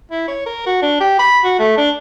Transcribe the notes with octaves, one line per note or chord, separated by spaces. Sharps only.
E4
C#5
A#4
F#4
D4
G4
B5
F#4
A3
D4